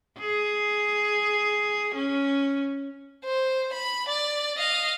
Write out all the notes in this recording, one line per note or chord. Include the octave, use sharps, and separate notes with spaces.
G#4
C#4
C5
B5
D5
D#5 F5